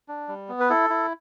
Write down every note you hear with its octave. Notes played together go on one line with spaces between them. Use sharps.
D4
G3
B3
B4
E4 A4
E4